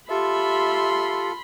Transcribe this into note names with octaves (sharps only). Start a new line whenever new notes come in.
F4 G4 A4 E5 B5 C6